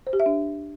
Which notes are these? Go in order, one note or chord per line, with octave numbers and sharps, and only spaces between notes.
C5
G4
E5
D4